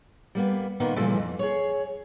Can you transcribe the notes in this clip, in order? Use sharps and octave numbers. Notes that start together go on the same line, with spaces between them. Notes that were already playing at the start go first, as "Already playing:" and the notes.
G3 A#3 B3
A#2 D#3 A#3 B3
A#2 C#3 E3 F3 G3 A3
F2
G#4 C#5